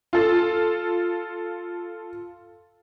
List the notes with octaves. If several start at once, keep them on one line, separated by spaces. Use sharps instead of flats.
F4 A4